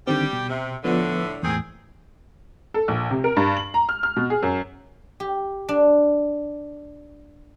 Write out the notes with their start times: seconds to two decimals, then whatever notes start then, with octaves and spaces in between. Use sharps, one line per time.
0.07 D3 D#3 G3 C4 G4
0.33 B2
0.48 C3
0.84 A2 D3 F3 B3
1.43 E2 A2 D#3 C4 G#4
2.74 A4
2.88 A#1
3.11 C3
3.24 A#4
3.37 G2
3.57 F#7
3.74 A#5
3.89 F6
4.03 F6
4.16 B2
4.30 G#4
4.43 F#2
5.20 G4
5.69 D4